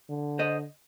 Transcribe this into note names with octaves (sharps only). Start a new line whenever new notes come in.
D3
C5 D#5